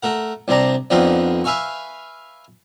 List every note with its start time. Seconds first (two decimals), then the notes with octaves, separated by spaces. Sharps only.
0.03 A3 A#4 F#5
0.48 C2 C3 C4 D4 A#5
0.90 F2 D3 B3 C4 D#4 F4
1.44 B4 E5 F5 G#5 C#6